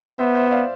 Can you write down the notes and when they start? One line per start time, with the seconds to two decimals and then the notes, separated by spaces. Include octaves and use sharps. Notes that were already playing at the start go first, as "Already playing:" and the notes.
0.19 B3 C5 E5
0.35 C5 E5
0.47 E5
0.51 D5 F5